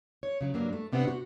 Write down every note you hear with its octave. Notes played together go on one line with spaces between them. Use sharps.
C#5
C#3 F#3
G2 F#3 A#3 D4
A3
G2 C3 B3 C4 D4 F#5
F#4